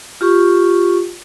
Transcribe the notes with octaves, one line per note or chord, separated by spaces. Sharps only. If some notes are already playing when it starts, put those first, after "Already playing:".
F4 G4 C#6